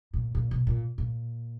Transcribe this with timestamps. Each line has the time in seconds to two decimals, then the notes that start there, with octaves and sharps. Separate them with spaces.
0.13 A#2
0.35 A#2
0.51 B2
0.67 A#2
0.98 A#2